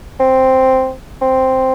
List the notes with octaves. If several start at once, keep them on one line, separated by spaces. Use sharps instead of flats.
C4
C4